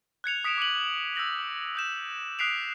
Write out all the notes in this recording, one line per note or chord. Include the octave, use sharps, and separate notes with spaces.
F#6 G#6 C#7 F7
D#6 B6 C#7 D7 E7 F7
D6 C#7 D#7 F#7
E6 G6 A#6 F#7
D#6 G6 E7
D#6 F#6 B6 C7 D7 F7